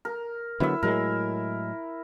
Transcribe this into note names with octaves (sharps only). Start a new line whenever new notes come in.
A#4
D3 F#3 B3 E4 E5
A2 F#3 G#3 A#4